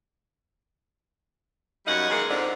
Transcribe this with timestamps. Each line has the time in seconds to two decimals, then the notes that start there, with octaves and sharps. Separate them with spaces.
1.86 F#2 G3 D#4 C#5 F5 F#5
2.10 D#3 E3 G#3 A#3 F5
2.29 F2 G#2 D3